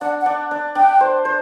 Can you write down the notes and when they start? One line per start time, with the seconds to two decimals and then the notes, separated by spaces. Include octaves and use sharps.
0.01 D4 F#5
0.20 F#5
0.26 D4
0.51 D4
0.75 D4 G5
1.00 C5
1.25 C5